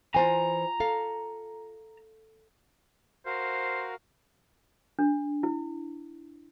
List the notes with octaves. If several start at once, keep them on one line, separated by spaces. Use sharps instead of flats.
E3 F4 C5 G#5 A#5
A4 F5
F#4 A#4 C5 F5
D4
E4